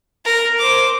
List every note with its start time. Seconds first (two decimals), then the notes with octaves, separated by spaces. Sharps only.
0.25 A#4
0.59 C5 D6